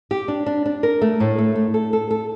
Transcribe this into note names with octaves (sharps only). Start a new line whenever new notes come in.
G4
D4
D4
D4
A#4
A3
A2
A3
A3
A4
A4
A4